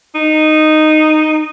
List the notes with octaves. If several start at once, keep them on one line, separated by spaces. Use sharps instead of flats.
D#4